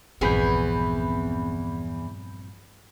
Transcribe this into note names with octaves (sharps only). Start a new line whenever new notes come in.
A#1 E2 G2 E3 C4 G#4 B5 G6